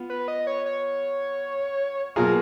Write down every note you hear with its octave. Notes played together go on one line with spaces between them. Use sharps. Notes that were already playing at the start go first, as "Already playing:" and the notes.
Already playing: B3 F4
B4
D#5
C#5
C#5
B2 F#3 A#3 F4 G#4 A#4